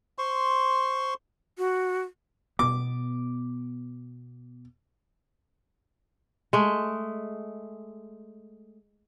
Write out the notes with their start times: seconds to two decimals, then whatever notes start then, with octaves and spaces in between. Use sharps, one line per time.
0.18 C5 C6 C#6
1.58 F#4
2.59 B2 B3 D6
6.53 G#3 A3